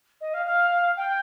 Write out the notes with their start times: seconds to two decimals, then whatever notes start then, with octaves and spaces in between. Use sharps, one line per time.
0.21 D#5
0.34 F5
0.46 F5
0.97 G5